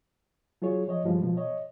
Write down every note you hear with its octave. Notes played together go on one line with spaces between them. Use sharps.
F#3 F4 G#4 C#5
F3 C#5 D#5
G2 E3 F3 G3 G#3
B2 F3
C#5 D#5